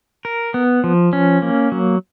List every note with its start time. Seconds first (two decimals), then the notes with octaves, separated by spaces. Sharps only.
0.25 A#4
0.54 B3
0.84 F3
1.13 C#4
1.42 A#3
1.72 F#3